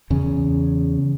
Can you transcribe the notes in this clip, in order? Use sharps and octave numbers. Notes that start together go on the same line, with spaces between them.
E2 C#3